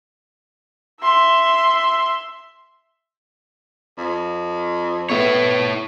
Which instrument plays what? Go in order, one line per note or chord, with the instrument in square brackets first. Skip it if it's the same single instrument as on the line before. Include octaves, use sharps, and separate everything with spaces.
[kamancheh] E5 C6
[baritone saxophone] F2
[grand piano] A3 B3 [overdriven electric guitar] E4 C#5